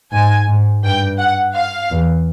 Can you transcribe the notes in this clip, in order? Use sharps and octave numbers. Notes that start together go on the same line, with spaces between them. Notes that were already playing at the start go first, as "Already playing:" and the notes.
G#2 G#5
G#2
G2 G5
F#5
F5
E2